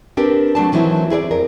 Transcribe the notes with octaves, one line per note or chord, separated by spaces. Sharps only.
C4 D4 G4 A#4 B4
F#3 A3 D4 A5
D#3 E3 F#3 C4 E4
E4 G#4 B4 D5
F2 A#4